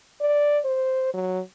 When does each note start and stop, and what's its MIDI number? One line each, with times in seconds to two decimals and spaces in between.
0.21 0.59 74
0.65 1.11 72
1.14 1.40 54